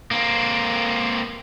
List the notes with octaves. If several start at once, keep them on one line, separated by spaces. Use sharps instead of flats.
A#3 C4